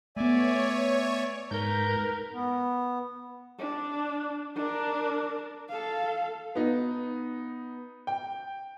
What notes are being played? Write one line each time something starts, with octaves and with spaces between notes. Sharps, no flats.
A3 B3 C#5 D5 E5 G#5
G#2 A#4 B4 G6
B3
D4
D4 A#4
A4 F5
B3 D#4
G5